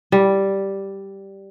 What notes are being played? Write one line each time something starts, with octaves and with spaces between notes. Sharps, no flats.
G3